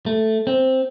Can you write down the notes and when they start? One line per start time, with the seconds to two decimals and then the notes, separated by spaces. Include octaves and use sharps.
0.06 A3
0.47 C4